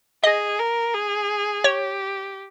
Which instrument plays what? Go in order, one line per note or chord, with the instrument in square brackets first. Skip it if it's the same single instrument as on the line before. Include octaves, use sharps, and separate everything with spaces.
[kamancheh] G#4 [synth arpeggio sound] D#5
[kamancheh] A#4
G#4
[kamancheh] G4 [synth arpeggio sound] C#5